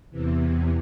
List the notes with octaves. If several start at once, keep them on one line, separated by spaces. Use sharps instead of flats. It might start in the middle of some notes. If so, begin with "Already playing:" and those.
E2 C3 E3